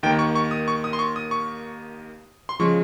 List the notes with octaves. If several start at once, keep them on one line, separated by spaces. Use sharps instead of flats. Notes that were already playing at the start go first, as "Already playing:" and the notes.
D#2 D#3 A#3 G5
C#6
C#6
D#6
C#6
D#6
C6
C#6
D#6
C#6
C6
C#3 F3 G#3 C#6